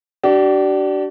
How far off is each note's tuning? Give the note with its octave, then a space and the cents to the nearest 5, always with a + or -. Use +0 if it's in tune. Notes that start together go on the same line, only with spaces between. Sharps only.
D4 +0 G4 -45